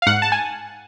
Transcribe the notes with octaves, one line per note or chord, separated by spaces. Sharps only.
F5
G#2 F#5
A5
G#5